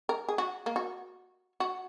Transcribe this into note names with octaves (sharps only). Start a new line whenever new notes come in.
A#4
G#4
F#4
A#3
F#4
F#4